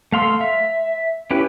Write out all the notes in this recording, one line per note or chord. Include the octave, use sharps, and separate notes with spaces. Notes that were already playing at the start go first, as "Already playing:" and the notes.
A3 F5 C6 E6
E5
C#4 E4 G4 B4